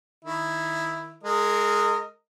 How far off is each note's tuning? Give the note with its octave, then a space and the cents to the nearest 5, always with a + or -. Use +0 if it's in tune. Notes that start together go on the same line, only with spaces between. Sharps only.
D#3 +0 E4 +0
G#3 +0 A#4 -30 D#5 +0